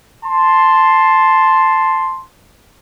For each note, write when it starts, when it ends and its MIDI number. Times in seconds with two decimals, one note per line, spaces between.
0.24 2.21 81
0.24 2.21 84